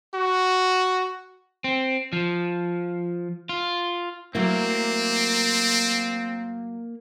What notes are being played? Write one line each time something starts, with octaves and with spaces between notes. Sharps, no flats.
F#4
C4
F3
F4
F#3 A3 A#3 C4 E4